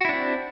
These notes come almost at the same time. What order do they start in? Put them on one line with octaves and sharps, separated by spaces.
F#4 E4 D4 C4